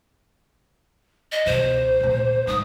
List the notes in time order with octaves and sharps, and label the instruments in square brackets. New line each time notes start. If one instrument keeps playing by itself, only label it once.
[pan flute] D#5
[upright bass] C#2 B2 [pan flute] C5
[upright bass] D2 A#2
[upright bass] G#2 [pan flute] D#6